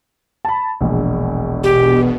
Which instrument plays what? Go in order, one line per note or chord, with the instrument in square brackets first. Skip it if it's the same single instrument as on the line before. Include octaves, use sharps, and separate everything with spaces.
[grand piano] A5 B5
E1 A#1
[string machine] B2 [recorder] G4